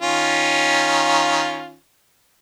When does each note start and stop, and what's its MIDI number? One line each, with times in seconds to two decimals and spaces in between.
0.01 1.75 51
0.01 1.75 61
0.01 1.75 65